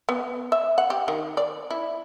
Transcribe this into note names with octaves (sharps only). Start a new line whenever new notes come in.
B3
E5
F#5
G4
D#3
D5
E4